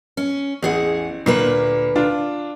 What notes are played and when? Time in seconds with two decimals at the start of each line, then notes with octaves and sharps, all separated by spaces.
0.17 C#4
0.63 A1 E2 G#4 F#5
1.26 D2 A#2 A#3 B4
1.96 D4 F4